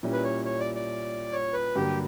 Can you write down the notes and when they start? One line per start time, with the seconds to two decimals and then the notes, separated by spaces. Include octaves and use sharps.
0.03 A#2 G3 C#4 E4
0.13 B4
0.24 C#5
0.45 C#5
0.60 D5
0.75 D5
1.32 C#5
1.53 B4
1.76 G2 D3 F#3 A#3 G4